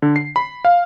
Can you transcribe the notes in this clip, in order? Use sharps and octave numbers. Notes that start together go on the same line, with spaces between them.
D3
C7
B5
F5